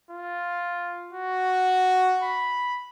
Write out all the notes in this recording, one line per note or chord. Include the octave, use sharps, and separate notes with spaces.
F4
F#4
B5